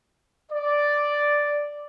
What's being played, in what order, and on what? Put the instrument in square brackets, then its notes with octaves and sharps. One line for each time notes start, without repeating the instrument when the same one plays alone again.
[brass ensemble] D5